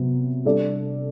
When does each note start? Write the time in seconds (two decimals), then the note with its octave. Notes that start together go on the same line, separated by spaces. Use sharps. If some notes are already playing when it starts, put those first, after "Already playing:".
Already playing: C3 F#3 B3
0.45 G3 D4 A4 D5